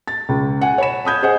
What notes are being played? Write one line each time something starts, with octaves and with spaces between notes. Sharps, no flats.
A6
C#2
F#5 G#5
C#5 B5 E7
B5 D#6 G6 G#6
G#4 C5 D#5 F#5 G#5